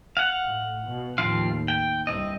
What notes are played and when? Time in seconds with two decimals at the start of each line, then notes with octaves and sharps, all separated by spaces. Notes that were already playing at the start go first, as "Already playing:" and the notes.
0.17 F5 F#5
0.46 A2
0.88 B2
1.18 D#2 A2 F3 C4 F5
1.68 G5
2.07 C2 G2 C3 C4 D#5